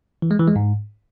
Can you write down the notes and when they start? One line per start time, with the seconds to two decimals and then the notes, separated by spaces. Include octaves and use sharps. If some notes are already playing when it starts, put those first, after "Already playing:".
0.22 E3
0.31 G#3
0.39 E3
0.47 G#3
0.56 G#2